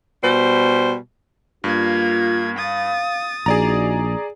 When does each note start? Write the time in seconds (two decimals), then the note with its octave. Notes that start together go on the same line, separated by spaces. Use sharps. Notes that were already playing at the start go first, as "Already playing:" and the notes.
0.23 B2 G3 C5
1.64 G2 A#3 F4 G#6
2.58 F5 D#6 A6
3.46 A#1 D#4 F#4 G#4 D5 A#5